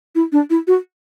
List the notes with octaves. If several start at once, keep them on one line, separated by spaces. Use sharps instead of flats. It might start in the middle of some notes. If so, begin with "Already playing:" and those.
E4
D4
E4
F#4